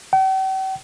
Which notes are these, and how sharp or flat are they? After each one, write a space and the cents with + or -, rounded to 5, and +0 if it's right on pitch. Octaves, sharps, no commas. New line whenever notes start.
G5 -45